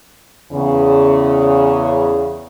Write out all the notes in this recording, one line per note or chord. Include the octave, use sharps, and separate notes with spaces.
E2 C#3